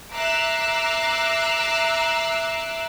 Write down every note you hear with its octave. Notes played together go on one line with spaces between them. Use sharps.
E5 A#5 D6 E6 F#6 C7